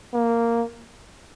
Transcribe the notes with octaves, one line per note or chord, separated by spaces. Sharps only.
A#3